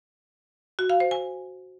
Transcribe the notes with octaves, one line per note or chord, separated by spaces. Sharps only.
F#4
F5
C5
G#5